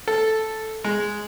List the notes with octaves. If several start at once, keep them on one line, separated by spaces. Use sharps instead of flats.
A4
G#3